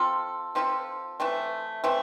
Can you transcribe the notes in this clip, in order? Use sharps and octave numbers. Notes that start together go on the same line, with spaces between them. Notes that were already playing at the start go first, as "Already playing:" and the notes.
Already playing: F3 C4 F4 A4
F3 C4 F4 A4
E3 A3 C4
E3 A3 C4